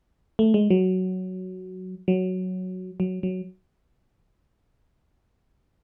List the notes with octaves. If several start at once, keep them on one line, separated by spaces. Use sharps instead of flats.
A3
G#3
F#3
F#3
F#3
F#3